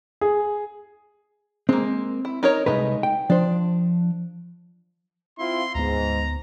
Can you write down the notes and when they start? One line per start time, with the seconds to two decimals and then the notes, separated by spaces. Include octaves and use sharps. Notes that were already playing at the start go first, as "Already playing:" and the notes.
0.21 G#4
1.69 G#3 A#3 C4
2.25 E4
2.43 D#4 A#4 C#5
2.66 C2 G2 G#3 A3 D#4 B4
3.03 G5
3.30 F3 D4 C5
5.39 C4 E4 F4 C6
5.75 D2 G#2 B3 A#5